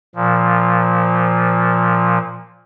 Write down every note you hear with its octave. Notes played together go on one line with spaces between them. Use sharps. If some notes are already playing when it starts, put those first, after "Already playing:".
A#2 F3